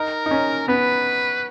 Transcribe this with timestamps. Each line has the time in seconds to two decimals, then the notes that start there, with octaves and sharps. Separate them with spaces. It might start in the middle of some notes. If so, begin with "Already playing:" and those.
Already playing: D#4 A#4
0.26 D#4
0.31 C#4
0.68 B3 B4